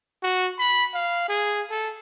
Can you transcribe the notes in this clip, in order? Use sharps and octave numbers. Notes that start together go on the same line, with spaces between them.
F#4
B5
F5
G#4
A4